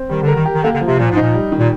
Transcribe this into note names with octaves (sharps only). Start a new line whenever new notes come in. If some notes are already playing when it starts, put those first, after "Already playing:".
Already playing: C4
D#3 G3
D3
A#4
D#3
G4
D#3
D3 A#3
D3
F3
C3
A#2 F3
G#2
D#4
A#2
G3
D#3
A#2